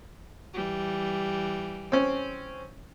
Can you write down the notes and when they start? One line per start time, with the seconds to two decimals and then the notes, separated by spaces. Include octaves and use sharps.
0.54 E3 G3
1.92 C4 C#4